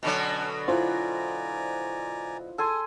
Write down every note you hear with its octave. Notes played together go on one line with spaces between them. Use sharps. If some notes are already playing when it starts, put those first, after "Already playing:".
B2 D3 F#3 C#4 D4
E4 F4 C5 D5 G#5 A#5
G#4 A4 G#5 C6